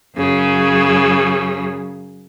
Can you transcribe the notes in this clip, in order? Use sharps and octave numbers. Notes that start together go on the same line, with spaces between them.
F#2 C#3